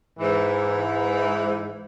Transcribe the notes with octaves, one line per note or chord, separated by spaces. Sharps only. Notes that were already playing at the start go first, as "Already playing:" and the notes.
G#2 E3